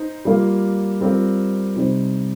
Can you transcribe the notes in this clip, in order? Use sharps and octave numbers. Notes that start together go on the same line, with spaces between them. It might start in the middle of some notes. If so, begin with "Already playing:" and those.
Already playing: D#4 C5
G3 A#3 F4
G3 C4 F4 A#4
C3 G3 D#4 C5